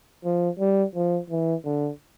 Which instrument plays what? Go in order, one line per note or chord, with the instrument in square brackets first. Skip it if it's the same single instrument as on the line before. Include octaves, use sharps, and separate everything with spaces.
[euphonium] F3
G3
F3
E3
D3